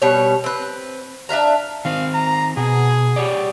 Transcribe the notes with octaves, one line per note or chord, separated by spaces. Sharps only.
B2 G3 C#5
C4 B4
D4 E5 F5 A#5
D#3 C4 F5
A#5
B2 G#4
G4 C#5 D5